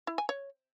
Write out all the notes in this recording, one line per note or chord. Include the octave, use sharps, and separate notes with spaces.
E4
G#5
C#5